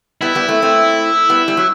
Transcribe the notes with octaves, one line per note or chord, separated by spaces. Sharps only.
G3 B3 E4
G3 B3
A3 C4
A3 C4
G3 B3
G3
F#3